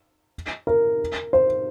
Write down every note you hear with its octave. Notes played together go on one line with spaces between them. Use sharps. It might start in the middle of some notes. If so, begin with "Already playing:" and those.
A#4
C5